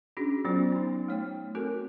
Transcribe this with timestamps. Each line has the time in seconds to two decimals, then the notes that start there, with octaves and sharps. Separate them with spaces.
0.17 C#4 D4 F#4 G#4
0.45 F#3 B3 C#4 F4 C5
0.72 B3 D#4
1.08 A3 C#5 G5
1.55 C4 F#4 A4 A#4